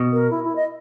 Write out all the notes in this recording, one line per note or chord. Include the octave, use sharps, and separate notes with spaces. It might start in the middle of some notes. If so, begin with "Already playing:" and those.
Already playing: B2
A#4
E4
E4
D#5